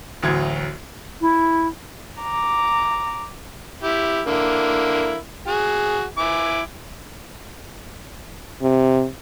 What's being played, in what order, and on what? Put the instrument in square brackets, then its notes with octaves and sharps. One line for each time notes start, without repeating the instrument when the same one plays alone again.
[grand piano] A1 D2 F#3 G#6
[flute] E4
[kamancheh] A#5 D6
[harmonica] E4 G4
D3 A#3 E4
F#4 G#4
E4 G#5 D6
[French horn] C3